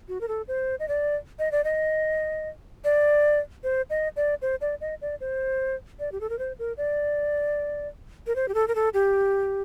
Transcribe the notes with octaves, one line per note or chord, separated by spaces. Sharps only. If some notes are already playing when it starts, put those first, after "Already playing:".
F#4
A#4
A4
C5
D#5
D5
D#5
D5
D#5
D5
C5
D#5
D5
C5
D5
D#5
D5
C5
D5
G4
A4
A#4
C5
A#4
D5
A#4
C5
G4
A4
A#4
A4
G4